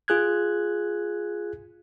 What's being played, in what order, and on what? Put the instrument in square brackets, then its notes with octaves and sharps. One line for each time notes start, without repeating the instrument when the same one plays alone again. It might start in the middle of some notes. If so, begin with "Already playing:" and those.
[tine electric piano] F4 G#4 F#6 G#6